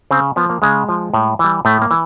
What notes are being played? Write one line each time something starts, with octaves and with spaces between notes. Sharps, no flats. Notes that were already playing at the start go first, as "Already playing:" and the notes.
C#3 C4
F3 B3
A#3
C#3 G#3
F3
A2
E3 G3
A2 A3
A#3
E3